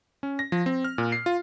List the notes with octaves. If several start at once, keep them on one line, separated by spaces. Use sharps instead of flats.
C#4
A#6
F3
C4
F6
A#2
C7
F4